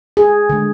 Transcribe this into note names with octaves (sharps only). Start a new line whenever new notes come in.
G#4
D3 G#3